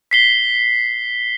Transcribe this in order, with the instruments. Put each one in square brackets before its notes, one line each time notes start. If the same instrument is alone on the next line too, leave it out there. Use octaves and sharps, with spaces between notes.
[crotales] B6 C7 G7